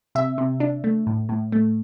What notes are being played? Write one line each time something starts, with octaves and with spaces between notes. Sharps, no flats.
C3 E5
C3
D4
A3
A2
A2
A3